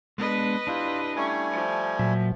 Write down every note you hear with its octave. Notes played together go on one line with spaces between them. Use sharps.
G#3 B3 D4 B4 D#5
D4 E4 F4 G4
G3 A3 C#4 G#5
F3
A#2 F#3 E5